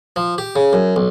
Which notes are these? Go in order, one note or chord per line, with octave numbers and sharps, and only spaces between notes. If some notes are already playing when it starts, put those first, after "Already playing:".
F3
G4
C#3
F#2
B1